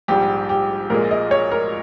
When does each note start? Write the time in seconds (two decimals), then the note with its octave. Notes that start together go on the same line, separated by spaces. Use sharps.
0.08 A#1 G#2 G3 G4
0.49 G4
0.90 A#1 A#2 G#3 A#4
1.11 D#5
1.31 C#5
1.52 A#4